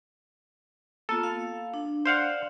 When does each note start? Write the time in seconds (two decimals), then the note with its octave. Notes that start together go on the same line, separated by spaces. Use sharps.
1.09 A#3 B3 F4 A4
1.23 F5
1.74 D4
2.06 C5 D5 F5 F#5